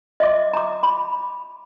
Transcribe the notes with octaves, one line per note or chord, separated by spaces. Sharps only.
D#5 E5 D6
A#5 D6
B5